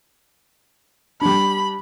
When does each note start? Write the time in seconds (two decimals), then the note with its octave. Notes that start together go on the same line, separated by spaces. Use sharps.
1.22 G3 D4 B5